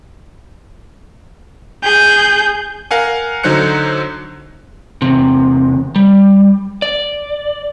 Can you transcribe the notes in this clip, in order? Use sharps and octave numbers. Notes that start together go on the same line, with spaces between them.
G#4 G6
A#4 F5 F#5 G#5
D3 F#3 D#4 C5 F#6 C#7
E2 C3
G3
D5